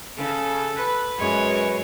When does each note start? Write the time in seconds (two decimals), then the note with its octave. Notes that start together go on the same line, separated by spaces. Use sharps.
0.19 C#3 A4
0.78 B4
1.19 F#2 G#3 C#5